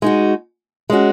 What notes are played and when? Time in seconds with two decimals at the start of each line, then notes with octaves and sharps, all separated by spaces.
0.02 G#3 D#4 F#4
0.90 G#3 C#4 F#4